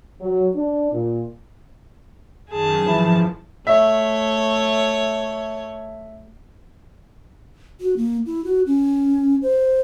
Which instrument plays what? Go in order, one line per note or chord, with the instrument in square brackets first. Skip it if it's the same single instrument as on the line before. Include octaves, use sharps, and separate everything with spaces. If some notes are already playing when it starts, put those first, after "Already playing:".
[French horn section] F#3
D4
A#2
[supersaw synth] F#2 D#3 [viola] G#4 A5
[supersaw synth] G#2 F3 [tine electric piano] E3 E4
[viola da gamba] A3 C#5 [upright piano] E5
[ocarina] F#4
A#3
E4
F#4
C#4
C5